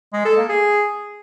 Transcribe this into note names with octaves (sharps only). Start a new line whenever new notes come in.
G#3
A4
A#3
G#4